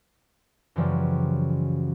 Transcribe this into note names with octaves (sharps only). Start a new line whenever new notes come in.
F#2 C#3 E3 F3 G3